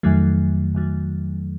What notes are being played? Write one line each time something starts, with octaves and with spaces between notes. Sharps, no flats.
F2 D#3 F#3 A3
F2 D#3 F#3